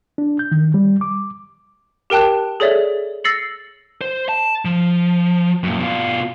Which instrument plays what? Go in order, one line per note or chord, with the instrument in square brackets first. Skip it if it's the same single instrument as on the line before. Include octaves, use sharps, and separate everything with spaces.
[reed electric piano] D4
G6
D#3
G3
D6
[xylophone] G4 A#4 G5 A5 F#6
G#4 A4 C#5 D5 E5
E6 A6 A#6 C7 C#7 F#7
[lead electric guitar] C5
A5
F3
F#2 A#2
B2 F4